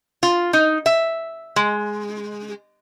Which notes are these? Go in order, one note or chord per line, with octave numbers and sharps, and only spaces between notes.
F4
D#4
E5
G#3